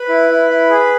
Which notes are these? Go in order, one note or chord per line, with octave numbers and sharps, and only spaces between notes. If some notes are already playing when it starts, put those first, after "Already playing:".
Already playing: B4 B5
E4
E4
E4
G#4